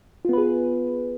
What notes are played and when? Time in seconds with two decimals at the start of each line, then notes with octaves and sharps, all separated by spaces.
0.25 F4
0.29 B3
0.33 B4
0.38 G#4